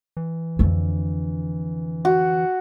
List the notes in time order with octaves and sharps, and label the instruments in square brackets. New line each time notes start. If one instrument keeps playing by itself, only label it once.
[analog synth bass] E3
[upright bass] F2 D3
[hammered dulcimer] F#4